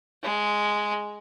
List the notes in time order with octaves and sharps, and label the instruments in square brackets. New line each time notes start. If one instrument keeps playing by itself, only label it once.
[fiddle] G#3